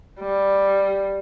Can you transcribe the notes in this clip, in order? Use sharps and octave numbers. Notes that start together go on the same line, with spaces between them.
G3